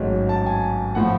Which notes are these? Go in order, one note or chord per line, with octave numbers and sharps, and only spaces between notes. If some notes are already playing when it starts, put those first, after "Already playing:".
Already playing: A1 G#2 F#3 C#4
A5
G#5
A2 F3 F#5